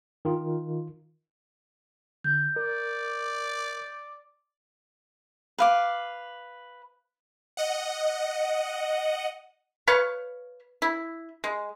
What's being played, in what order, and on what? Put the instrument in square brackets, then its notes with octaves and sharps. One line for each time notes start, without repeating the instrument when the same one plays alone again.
[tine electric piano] D#3 F4
[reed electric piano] D3 [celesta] G6
[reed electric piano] A#4 [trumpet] D5
[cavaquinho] B4 F5 D6
[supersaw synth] D#5 F#5
[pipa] B4 C#5 F5 C#6
E4
G#3